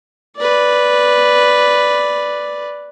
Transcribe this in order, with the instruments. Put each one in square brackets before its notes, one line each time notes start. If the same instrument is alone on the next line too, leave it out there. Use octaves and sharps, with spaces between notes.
[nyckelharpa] B4 D5